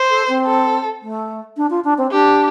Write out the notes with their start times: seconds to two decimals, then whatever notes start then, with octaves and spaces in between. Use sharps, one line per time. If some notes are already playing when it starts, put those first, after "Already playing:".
Already playing: C5
0.10 A4
0.28 C4
0.46 A4
1.02 A3
1.57 D4
1.70 F4
1.84 D4
1.98 C4
2.12 D4 G4